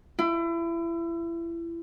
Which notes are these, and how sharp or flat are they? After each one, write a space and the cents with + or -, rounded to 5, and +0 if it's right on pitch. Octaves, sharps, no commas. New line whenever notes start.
E4 +30